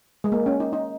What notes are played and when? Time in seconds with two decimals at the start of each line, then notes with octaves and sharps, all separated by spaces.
0.24 G#3
0.32 A#3
0.46 C#4
0.60 D#4
0.73 D#4